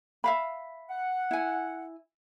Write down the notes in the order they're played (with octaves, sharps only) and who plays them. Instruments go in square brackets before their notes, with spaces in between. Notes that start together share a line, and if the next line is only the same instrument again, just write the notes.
[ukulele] E5 F5 B5
[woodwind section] F#5
[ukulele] E4 G#5